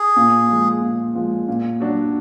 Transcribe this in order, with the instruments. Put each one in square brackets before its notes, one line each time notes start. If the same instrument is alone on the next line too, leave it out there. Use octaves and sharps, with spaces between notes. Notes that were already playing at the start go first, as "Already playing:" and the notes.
Already playing: [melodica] G#4
[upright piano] A#2
F3 G#3
A#2
F3 G#3
A#2
F#3 D4 F#4